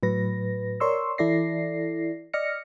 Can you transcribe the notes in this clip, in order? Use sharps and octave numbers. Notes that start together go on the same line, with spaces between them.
A2 F#3 B4 A#6
A#4 C#5 D5 C6 C#6 E6
E3 E4 A4 D5 A#6 C7
D5 D#5 F6 A#6 C#7